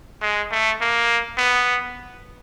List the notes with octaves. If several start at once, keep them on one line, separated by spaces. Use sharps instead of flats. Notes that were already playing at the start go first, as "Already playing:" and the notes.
G#3
A3
A#3
B3